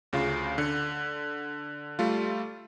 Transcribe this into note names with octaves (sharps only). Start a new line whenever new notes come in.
D2 C#3 F4
D3
G3 A3 F4